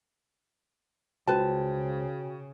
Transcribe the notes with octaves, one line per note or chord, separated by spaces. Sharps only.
C#2 C#3 F#4 B4 C5 G5 A5